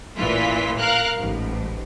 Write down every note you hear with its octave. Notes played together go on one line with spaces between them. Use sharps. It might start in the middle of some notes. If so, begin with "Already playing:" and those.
A1 A#2 E3 F4 B6
A#4 F5 F#6
A1 G#2